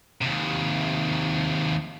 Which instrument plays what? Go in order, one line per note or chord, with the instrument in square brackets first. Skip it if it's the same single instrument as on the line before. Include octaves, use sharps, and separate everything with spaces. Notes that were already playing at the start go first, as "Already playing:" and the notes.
[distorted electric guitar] D#2 C3